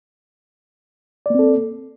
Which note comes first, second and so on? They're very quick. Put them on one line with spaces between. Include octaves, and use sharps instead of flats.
D5 A#3 C4 A4